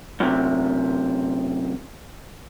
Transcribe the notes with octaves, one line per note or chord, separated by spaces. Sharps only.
F#2 C3